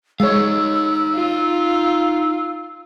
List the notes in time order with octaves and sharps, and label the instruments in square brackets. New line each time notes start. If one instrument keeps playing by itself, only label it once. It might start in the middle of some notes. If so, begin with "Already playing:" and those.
[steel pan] G#3 C#5 [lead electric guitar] D#4 F5 [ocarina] E6
[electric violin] F4